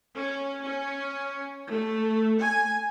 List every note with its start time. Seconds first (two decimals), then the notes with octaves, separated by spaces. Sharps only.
0.15 C#4
0.65 C#4
1.71 A3
2.40 G#5